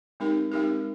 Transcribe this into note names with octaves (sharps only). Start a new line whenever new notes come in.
G#3 C4 D#4 G4 A#4
G#3 C4 D#4 G4 A#4